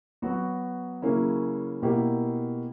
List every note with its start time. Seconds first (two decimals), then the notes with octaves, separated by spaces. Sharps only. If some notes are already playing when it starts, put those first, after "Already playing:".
0.22 F#3 B3 F#4
1.02 C#3 F#3 A#3 C#4 E4
1.82 B2 A#3 E4 G4